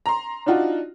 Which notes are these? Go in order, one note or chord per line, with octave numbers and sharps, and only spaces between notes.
A#5 C6
D4 D#4 F4 F#4